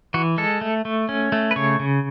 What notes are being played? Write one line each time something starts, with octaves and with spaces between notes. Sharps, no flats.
E3 F#4
G#3 A4
A3
A3
C#4
A3
B4
C#3 C#5
C#3